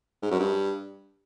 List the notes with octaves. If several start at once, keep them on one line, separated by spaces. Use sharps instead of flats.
G#2
F#2
G2